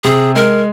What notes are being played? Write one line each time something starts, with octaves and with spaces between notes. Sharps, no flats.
C3 G#4
G#3 A#4